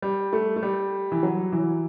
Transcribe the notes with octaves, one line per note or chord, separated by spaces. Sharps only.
G3
A3
A3
G3
E3
F#3
E3